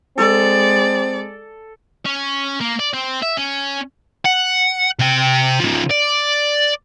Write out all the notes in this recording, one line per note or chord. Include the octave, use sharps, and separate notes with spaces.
G#3 C4 A4 D5
C#4
A#3
D5
C4
E5
C#4
F#5
C3 G5
C#3 F3
D5